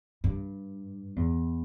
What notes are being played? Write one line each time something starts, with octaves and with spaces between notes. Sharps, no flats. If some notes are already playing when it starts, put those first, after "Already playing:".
G2
E2